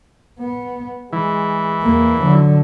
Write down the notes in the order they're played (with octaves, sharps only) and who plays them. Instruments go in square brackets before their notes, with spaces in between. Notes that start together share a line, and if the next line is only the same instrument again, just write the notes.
[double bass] B3
[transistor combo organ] E3 [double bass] G#3
[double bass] E2 A#3
D3 F#3